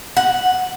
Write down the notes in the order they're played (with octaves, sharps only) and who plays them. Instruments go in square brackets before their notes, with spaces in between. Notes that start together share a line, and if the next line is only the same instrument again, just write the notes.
[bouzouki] F#5